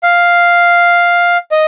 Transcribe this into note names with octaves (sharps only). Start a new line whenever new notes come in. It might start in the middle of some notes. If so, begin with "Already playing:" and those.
F5
D#5